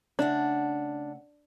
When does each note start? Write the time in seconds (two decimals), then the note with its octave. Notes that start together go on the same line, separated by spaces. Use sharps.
0.19 C#3 A3 D4 F#5